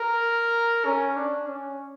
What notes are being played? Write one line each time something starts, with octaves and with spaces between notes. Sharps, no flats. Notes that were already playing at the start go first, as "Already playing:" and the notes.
Already playing: A#4
C#4
D4
C#4